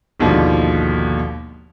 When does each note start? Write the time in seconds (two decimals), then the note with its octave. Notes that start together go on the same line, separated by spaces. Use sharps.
0.20 G#1 D#2 B2 D3 F3